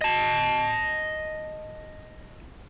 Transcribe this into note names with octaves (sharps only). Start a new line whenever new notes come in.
D#5 A5